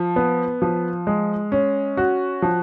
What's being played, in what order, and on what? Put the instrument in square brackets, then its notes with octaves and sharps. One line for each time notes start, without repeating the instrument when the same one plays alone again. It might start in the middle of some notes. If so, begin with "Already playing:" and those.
Already playing: [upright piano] F3
B3
F3
G#3
C#4
F#4
F3